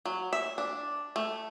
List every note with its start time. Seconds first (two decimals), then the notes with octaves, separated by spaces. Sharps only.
0.05 F#3
0.33 E5
0.58 D4
1.16 A3